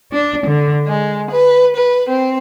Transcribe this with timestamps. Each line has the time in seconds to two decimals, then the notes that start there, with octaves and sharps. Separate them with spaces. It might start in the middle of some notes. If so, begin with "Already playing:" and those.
0.12 D4
0.46 D3
0.86 G#3
1.31 B4
1.75 B4
2.09 C4